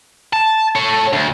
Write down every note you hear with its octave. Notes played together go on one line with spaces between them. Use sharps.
A5
A4 C#5
D2